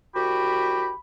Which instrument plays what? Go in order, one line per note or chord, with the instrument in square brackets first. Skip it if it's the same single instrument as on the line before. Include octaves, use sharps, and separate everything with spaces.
[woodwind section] C2 F#4 G4 [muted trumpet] B5